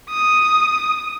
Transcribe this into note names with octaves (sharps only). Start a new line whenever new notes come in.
D#6